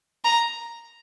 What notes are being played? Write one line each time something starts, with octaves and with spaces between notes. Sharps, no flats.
A#5